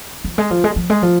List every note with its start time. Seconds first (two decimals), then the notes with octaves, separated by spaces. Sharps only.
0.24 F3
0.38 G#3
0.50 F3
0.64 G#3
0.76 F3
0.90 G#3
1.02 F3